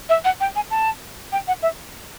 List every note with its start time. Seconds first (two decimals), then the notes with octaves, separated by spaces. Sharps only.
0.09 E5
0.25 F#5
0.40 G5
0.56 G#5
0.71 A5
1.32 G5
1.48 F#5
1.63 E5